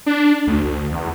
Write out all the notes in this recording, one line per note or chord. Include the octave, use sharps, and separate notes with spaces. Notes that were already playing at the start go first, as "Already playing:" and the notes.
D4
D2
D2
E2